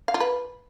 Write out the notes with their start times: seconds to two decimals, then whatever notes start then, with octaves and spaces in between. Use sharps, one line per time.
0.08 F5
0.14 F4
0.20 B4